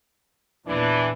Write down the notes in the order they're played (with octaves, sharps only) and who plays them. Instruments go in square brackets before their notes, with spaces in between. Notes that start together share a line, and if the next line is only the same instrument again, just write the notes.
[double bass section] E2 A#2 [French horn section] E3 D4